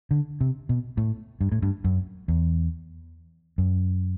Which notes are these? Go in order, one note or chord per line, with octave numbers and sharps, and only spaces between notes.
D3
C3
B2
A2
G2
A2
G2
F#2
E2
F#2